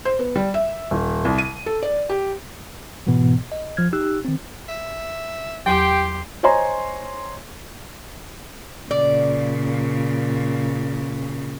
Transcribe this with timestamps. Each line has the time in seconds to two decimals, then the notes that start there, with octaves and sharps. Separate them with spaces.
0.05 C5
0.19 B3
0.36 G3
0.54 E5
0.91 D#1
1.25 C2
1.38 D#7
1.66 A4
1.83 D5
2.10 G4
3.07 G#2 B2 E3 B3
3.52 D#5
3.77 F3 F6 G#6
3.93 D#4 G4 E6 F#6
4.25 D#3 C4
4.69 E5
5.66 E2 F#3 G4 G5 C6
6.43 C5 C#5 D#5 G#5 A#5 C6
8.91 A#2 C#3 D5